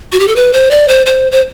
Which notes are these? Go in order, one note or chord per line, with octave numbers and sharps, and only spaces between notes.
F#4
G4
A4
B4
C5
D5
C5
C5
C5